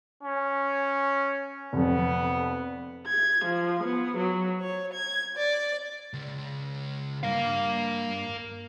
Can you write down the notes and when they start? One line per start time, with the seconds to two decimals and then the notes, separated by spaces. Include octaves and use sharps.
0.23 C#4
1.73 F1 F2 B3
3.08 G#6
3.45 F3
3.83 B3
4.17 F#3
4.61 C#5
4.94 G#6
5.37 D5
6.13 C#2
7.23 G2 A#4 F5